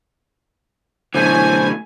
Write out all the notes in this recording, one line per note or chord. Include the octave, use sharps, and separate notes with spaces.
F#2 B2 D3 E3 A3 C5 G#5 G#6